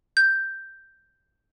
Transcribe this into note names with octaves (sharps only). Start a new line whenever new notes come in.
G6